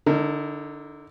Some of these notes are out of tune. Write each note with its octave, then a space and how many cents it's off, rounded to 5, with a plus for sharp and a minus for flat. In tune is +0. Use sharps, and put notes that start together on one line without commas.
D3 +0 D#4 +35 A#4 -20